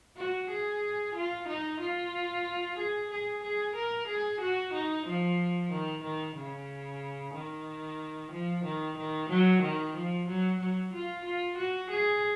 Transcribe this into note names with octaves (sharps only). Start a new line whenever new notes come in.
F#4
G#4
F4
D#4
F4
G#4
G#4
G#4
A#4
G#4
F#4
D#4
F3
D#3
D#3
C#3
D#3
F3
D#3
D#3
F#3
D#3
F3
F#3
F#3
F4
F4
F#4
G#4